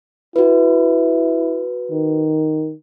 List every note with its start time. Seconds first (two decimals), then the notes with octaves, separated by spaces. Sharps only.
0.36 E4 F#4 B4
1.91 D#3